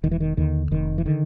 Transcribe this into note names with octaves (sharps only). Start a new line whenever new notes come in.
E1 D#3
E3
D#3
D#2 D3 D#3
F1 D#3
E3
D3 D#3